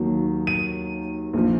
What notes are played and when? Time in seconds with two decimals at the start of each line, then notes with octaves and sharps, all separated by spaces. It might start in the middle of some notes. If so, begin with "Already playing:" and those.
Already playing: D#2 D#3 F#3 A#3
0.47 D#7
1.33 A#1 F3